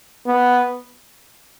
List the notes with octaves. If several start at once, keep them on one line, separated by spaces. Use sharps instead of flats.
B3